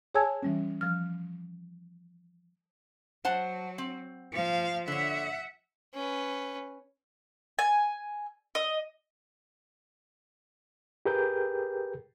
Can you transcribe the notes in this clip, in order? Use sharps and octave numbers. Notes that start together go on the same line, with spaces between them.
G#4 C#5 G#5 A5 E6 G#6
E3 G3 C#4
F3 F6
F#3 C5 F#5 A5
C4
F3 F5
D3 C#5 E5 F#5
C#4 B4
G#5
D#5
G4 G#4 A#4 B4 G5 G6